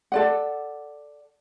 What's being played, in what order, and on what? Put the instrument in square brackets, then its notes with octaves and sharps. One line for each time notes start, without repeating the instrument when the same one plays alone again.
[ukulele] A4 D5 F#5